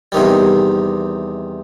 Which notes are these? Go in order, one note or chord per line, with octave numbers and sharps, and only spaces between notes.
E2 C3 D#3 G3